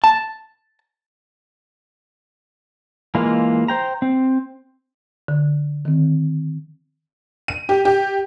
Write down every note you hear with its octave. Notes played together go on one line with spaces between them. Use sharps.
A5
E3 G#3 A#3 F4
C5 G5 A#5
C4
D3
D#3 C4
D#7
G4
G4